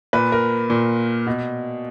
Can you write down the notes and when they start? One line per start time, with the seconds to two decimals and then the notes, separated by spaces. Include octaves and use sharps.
0.13 A#2 B4
0.32 A#4
0.70 A#2
1.27 B2